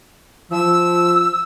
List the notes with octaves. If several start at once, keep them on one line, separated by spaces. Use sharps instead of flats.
F3 E6